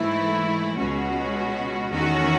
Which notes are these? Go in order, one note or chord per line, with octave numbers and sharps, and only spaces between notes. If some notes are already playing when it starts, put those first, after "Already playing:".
Already playing: G#2 E3 A3 E4
C#2 B2 G#3 C#4 F#4
E2 D#3 A3 C#4 F#4